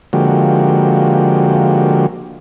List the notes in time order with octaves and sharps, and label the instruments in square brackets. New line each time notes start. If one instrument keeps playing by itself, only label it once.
[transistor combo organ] D3 F3 G#3 A#3 F#4 G4